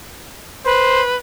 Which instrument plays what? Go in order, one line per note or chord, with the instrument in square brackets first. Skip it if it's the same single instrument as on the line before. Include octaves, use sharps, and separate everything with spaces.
[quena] B4 [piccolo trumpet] C5